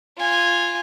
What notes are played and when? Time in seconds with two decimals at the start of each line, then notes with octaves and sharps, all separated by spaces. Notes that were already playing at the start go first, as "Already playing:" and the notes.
0.17 F4 G#5